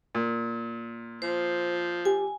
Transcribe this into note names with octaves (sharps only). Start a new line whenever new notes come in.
A#2
F3 C5
G4 G#5